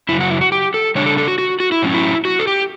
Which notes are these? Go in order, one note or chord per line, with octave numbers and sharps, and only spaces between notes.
F#2 C#3 F#3 E4
F#4
E4
F#4
G4
A4
C#3 G3 D4 C#5
A4
A4
F#4
F#4
F#4
E4
A2 F#3 C#4
E4
F#4
A4
G4